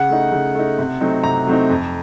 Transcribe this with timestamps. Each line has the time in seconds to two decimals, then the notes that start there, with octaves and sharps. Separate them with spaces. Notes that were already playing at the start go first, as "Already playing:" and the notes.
Already playing: C#3 F#5
0.10 A3 D#4
0.32 C#3
0.55 A3 D#4
0.79 C3
1.01 F#3 A3 C4 D#4
1.24 C3 A#5
1.47 F#3 A3 C4 D#4
1.70 F2